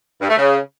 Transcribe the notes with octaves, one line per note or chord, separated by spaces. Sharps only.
G2
A3
C#3